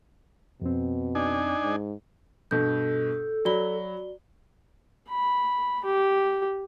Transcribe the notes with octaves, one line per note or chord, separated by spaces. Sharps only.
F2 B2 C4
D4 D#4 G#5
G#2
G2 B2 A4 G6
F#3 F#4 D5 B5 G7
B5
G4